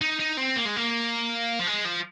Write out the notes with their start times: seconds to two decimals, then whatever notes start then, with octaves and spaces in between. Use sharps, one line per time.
0.01 D#4
0.20 D#4
0.37 C4
0.56 A#3
0.65 G#3
0.76 A#3
1.60 F3
1.67 G#3
1.85 F3